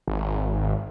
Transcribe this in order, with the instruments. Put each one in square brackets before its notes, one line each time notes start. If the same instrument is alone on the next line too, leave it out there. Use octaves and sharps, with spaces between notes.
[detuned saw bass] G#1